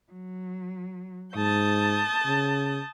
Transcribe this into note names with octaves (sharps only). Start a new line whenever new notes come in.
F#3
G#2 A5 D#6 G6
C#3